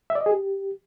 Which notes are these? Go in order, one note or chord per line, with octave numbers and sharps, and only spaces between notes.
E5
D5
D#5
G#4
G4